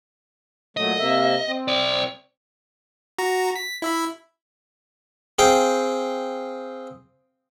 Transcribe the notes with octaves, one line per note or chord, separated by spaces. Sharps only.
A#2 F#3 A3 D#5
C3 A#3 E5
C4
C5 D5
F#4 A#5
B6
E4 E5 B5
C4 G#4 F5 G5